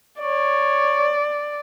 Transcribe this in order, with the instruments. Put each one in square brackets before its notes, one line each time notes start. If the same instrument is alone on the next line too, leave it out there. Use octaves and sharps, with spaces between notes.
[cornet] C#5 [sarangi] D5